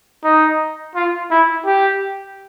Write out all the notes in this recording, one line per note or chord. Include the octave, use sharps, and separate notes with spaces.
D#4
F4
E4
G4